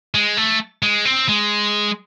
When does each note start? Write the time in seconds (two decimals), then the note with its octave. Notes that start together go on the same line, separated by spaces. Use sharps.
0.15 G#3
0.37 A3
0.83 G#3
1.05 C4
1.28 G#3